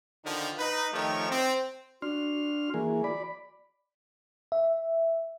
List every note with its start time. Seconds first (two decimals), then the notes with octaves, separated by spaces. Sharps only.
0.24 D3 D#3 F3
0.58 D#4 B4
0.93 D#3 F3 A3 D#4 G4 C#5
1.30 C4
2.02 D4 F#4 C6 F6
2.74 E3 A#3 G#4
3.04 D5 B5
4.52 E5